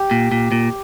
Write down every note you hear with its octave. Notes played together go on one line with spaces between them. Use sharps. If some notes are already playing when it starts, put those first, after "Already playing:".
Already playing: G4
A#2
A#2
A#2